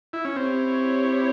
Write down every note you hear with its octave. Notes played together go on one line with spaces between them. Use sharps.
E4
C#4
C4 E4 G4 C#5